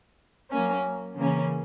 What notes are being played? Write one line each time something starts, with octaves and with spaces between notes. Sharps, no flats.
F#3 A#3 C#4
C#3 E3 A#3 C#4